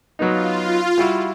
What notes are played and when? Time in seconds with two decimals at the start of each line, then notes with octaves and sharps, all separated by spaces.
0.19 F#3 B3 D#4 F4
0.98 G3 E4 F#4